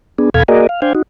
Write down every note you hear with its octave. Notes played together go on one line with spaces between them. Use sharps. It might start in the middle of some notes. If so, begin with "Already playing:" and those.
B3 D4 G#4
E2 B2 A4 F5 B5 G#6
A#3 F#4 G#4 A#4 D5 D#5
F5
D4 C5 F5 G5 G#5
D#4 F#4